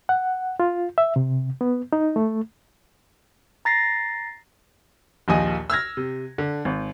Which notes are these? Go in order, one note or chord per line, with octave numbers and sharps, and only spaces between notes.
F#5
F4
E5
C3
B3
D#4
A3
A#5 A6 A#6 C7
A#1 D#2 F3 D#5 G#5
E6 F6 G#6 A#6
C3
D3
G#1